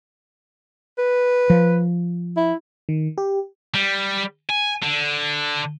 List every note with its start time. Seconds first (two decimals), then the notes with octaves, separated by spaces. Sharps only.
0.98 B4
1.50 F3
2.36 E4
2.89 D#3
3.18 G4
3.74 G3
4.50 G#5
4.83 D3